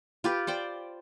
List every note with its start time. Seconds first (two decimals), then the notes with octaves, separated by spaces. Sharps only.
0.24 F4 G4 B4
0.47 C5 D5 G5